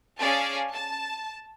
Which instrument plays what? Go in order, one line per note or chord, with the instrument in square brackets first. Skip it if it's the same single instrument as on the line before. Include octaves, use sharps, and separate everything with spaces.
[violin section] C#4 G#4 D5 F5 A5
A5